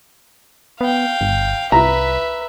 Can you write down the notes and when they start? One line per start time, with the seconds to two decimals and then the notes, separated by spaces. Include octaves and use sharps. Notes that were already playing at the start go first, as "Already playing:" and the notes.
0.81 B3 F5 G5
1.21 G1
1.72 C2 B4 E5 A#5